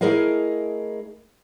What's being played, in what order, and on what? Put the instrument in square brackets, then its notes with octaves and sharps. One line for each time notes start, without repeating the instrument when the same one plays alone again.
[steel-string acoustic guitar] A3 E4 G#4 A#4 D#5 F5